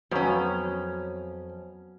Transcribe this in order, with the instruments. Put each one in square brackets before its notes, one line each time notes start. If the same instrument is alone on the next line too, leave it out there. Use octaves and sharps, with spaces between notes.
[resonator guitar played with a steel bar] F2 C#4 [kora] F#3 B3 F5